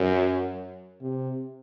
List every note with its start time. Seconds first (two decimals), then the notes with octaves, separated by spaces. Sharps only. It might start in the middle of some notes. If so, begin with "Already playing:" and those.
Already playing: F#2
1.01 C3